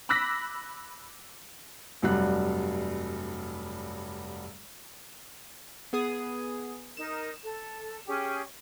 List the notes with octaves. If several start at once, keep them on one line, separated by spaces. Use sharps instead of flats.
B5 D6 E6 F#6 A#6 B6
F1 G2 F#3 G3 F#6
B3 G#4 D#6
D#4 A#4 E7
A4
C#4 G4 G#4